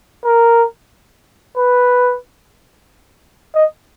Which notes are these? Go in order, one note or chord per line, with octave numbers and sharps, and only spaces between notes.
A#4
B4
D#5